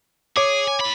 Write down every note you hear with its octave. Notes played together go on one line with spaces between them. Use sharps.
G#4 C#5 D6
G#5
A2 B5